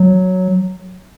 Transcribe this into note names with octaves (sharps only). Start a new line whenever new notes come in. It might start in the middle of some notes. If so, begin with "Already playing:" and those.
Already playing: F#3